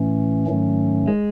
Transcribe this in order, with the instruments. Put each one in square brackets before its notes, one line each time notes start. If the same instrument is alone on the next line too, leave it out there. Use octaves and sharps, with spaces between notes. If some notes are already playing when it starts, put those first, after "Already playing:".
Already playing: [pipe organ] A2 E3 A3 C#4
G#2 D#3 F#3 A3 C#4
[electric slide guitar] G#3